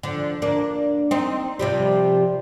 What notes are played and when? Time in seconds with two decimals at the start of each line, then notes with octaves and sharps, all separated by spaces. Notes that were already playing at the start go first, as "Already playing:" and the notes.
0.03 D3 F3
0.42 A#3 D4
1.11 C4 D#4
1.59 C3 F3 G3